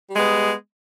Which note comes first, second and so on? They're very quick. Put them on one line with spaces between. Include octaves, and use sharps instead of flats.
G3 G#3 B3